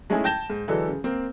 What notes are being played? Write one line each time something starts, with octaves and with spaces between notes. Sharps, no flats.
G#3 A3 C#4 D#4 E4 G#4
G5 A5 G6 A#6 E7 G7
G#2
D3 E3 F#3 G#3 D4 A4
C#3
A#3 C4